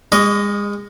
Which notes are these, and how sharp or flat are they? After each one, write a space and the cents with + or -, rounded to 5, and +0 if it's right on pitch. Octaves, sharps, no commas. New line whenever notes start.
G#3 -35 D#5 +0 C#6 +45